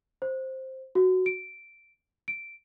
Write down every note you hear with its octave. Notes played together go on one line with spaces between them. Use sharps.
C5
F#4
D7
D7